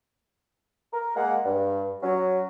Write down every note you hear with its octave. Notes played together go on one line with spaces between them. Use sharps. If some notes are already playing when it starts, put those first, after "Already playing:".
A#4
G#3 A#3 F5 F#5
G2
F#3 C#4